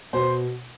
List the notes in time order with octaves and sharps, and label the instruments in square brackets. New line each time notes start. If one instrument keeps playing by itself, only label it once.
[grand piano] B2 C5